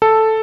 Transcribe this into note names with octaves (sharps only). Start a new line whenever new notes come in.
A4